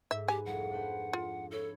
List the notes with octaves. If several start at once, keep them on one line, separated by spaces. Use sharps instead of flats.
G#2 E5
B3 G4 G#5
C2 F2 F#5
D4 B4 C5
F4
E4 A4 C#5